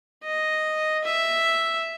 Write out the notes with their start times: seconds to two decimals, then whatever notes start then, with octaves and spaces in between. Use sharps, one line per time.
0.24 D#5
1.04 E5